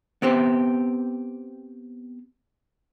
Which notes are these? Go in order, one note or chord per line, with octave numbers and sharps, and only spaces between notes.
B3 C4 G4 C5